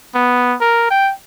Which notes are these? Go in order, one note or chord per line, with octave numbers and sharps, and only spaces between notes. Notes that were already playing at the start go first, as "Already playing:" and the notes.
B3
A#4
G5